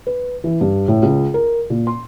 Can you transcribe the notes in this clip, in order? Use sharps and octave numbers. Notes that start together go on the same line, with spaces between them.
B4
E3
G2
A2
C#2
A#4
A#2
C6